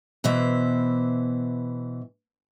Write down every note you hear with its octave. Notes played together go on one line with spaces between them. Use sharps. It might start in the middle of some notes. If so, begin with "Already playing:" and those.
B2 E3 C5 E5